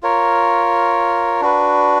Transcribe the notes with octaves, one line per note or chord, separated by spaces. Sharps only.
F4 A#4 C#5
D4 F#4 B4